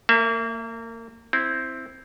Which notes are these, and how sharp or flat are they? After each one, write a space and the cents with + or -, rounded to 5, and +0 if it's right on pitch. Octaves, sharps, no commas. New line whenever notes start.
A#3 -30 E5 +20
C4 +0 E4 +0